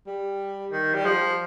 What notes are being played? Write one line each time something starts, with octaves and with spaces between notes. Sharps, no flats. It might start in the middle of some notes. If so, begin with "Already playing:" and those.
G3
D#3
G3
F3